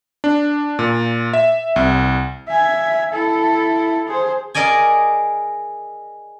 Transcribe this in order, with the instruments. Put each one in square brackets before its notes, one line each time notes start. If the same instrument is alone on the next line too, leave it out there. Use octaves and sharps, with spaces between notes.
[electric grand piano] D4
A#2
E5
C2
[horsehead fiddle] E5 G#5
E4 A4
G#4 C5
[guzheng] G#4 A#4 D5 D#5 G#5